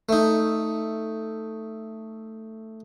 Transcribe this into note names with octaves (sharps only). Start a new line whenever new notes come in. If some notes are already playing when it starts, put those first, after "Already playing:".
A3 D#4